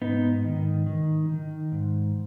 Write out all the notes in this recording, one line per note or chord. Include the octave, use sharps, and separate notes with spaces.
G#2 B3 D#4
D#3
D#3
D#3
G#2